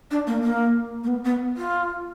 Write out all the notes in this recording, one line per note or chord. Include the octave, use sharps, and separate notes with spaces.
D4
A#3
A#3
A#3
B3
B3
F4